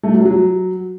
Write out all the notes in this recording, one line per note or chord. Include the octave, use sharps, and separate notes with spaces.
A3
F#3
F#3